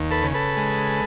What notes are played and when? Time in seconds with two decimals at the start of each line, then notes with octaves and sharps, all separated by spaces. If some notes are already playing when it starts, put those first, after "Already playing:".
Already playing: D#2
0.11 A4 B4
0.23 C#3
0.34 A4 B4
0.57 G#3